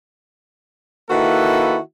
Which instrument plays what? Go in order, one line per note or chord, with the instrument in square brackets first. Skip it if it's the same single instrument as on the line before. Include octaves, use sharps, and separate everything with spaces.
[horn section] D#3 A#3 E4 F#4 A4 B4